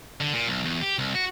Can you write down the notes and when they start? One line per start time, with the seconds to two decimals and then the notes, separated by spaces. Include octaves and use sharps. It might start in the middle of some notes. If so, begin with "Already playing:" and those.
0.21 D3
0.33 A#2
0.48 B1
0.65 E2
0.81 G4
0.98 C2
1.15 F#4